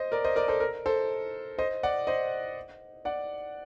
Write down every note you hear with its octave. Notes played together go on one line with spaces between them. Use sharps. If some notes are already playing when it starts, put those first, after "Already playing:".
Already playing: C5 D#5
A#4 D5
C5 D#5
A#4 D5
A4 C5
A#4
A4 C5
C5 D#5
D5 F#5
C5 D#5
D5 F#5